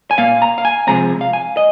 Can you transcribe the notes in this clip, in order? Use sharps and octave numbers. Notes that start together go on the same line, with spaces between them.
G#5
A#2 A#3 F5
A#5
F5
G#5
C3 F3 G#3 C4 A#5
F5
G#5
D#5